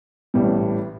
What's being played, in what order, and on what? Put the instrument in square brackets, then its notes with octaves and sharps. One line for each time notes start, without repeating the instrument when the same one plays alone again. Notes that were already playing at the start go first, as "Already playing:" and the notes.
[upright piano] A1 A2 G3